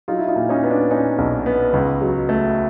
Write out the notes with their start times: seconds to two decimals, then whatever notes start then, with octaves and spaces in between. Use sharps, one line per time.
0.08 F#3 D#4 F4
0.18 E4
0.28 D#4 F4
0.36 A#2
0.49 C#4 D#4
0.63 B3
0.70 D4
0.91 A#2 C#4 D#4
1.18 B1
1.46 B3
1.73 C#2
2.01 F#3
2.29 A3